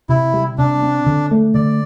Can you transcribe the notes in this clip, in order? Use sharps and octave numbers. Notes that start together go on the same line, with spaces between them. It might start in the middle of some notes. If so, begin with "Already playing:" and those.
C3 E4
G3
C3 D4
C4
D3
A3
D3 D5